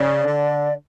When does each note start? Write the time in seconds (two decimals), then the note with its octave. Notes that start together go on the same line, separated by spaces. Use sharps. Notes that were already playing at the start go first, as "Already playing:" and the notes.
Already playing: C#3 D5
0.24 D3